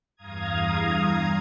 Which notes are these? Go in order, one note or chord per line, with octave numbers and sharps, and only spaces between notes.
E2 G2 F5 A#5 D#6 G#6